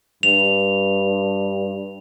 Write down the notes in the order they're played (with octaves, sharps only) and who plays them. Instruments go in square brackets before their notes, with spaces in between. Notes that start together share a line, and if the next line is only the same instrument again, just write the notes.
[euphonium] G2 [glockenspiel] F7